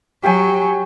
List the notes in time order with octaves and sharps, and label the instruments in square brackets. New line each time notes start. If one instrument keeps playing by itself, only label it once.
[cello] F#3 [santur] G4 G5 G#5